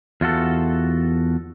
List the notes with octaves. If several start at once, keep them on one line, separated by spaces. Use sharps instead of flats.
E2 F4 F#4 A4